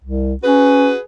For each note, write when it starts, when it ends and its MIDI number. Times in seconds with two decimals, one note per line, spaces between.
0.04 0.34 36
0.43 0.91 61
0.43 0.99 66
0.43 0.99 68
0.43 0.99 71